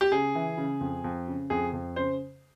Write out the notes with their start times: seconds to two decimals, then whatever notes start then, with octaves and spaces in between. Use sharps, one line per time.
0.01 G4
0.11 C#3 G#4
0.35 E3
0.58 C#3
0.81 F2
1.04 F2
1.28 C#3
1.50 F2 G#4
1.73 F2
1.96 C#3 C5